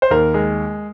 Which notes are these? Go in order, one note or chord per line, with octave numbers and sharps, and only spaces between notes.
C5
D#2 A#4
G#3